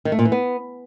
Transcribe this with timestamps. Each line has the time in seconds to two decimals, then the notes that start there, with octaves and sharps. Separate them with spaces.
0.05 D#3
0.12 A3
0.19 A#2
0.25 E3
0.32 B3